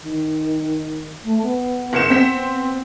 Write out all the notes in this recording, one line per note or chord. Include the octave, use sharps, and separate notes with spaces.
D#3
A3
B3
F#1 C#7 E7
B3 C4 B6 E7